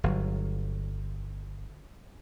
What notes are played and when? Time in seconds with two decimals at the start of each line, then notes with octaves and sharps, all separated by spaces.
0.04 G1 F#3